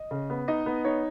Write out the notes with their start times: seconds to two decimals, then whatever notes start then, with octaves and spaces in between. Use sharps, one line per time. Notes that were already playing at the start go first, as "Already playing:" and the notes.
Already playing: D#5
0.11 C#3
0.30 B3
0.48 D#4 D#5
0.66 B3
0.85 D#4 C#5